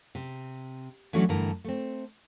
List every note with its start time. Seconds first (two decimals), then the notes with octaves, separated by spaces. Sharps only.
0.15 C3
1.13 E3 F#3 A3 C#4 D4 F#4
1.29 G2 D3 E3 A3 A#4
1.64 A3 C4